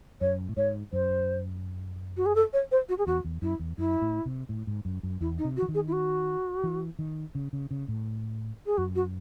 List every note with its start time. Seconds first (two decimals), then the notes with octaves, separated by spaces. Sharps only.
0.21 F#2 C#5
0.49 A2
0.57 G#2 C#5
0.93 F#2 C5
2.17 F#4
2.26 G#4
2.35 A4
2.53 C#5
2.72 C5
2.89 F#4
2.98 G#4
3.07 E2 F#4
3.25 E2
3.42 F#2 E4
3.60 E2
3.78 F#2 E4
4.02 A2
4.26 C3
4.49 A2
4.67 G#2
4.85 F#2
5.03 F#2
5.21 E2 E4
5.38 D#4
5.45 C3
5.57 F#4
5.62 E3
5.68 D#3
5.74 G#4
5.87 E4
5.93 F#4
6.64 E3
6.99 D#3
7.35 C#3
7.53 C#3
7.71 C#3
7.88 A2
8.66 G#4
8.78 F#2 F#4
8.95 F#4